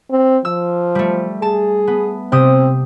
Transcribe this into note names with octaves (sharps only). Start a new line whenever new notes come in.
C4
F3 E6
G3 A3
G#4 A5
B3
C3 C4 G4 D#6